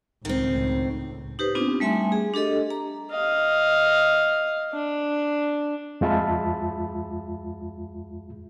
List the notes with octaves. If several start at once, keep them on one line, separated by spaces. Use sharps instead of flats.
C#2 A2 D#3 C4
D#4 G4 B4 C5
B3 C4 D4 D#4 F4
G3 A3 E5 G#5 C6
G#4
D4 G4 A4 D#5
A#5
D#5 F5
D4
F2 G#3 F4 E5 A5 B5